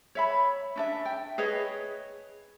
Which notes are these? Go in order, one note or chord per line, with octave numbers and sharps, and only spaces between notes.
C#5 E5 B5
C#4 D4 E5
G5
G#4 B4 C#5 D#5